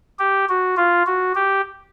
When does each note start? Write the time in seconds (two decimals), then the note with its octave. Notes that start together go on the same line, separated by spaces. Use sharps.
0.19 G4
0.49 F#4
0.77 F4
1.07 F#4
1.35 G4